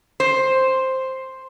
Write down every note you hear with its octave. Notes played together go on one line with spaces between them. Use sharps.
C5